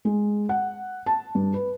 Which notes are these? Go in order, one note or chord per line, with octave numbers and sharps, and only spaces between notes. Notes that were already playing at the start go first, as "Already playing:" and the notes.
G#3
F#5
A5
G2
B4